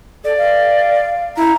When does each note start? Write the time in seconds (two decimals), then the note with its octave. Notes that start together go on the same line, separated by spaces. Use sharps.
0.24 A4 D5
0.37 F5
1.37 E4 A#5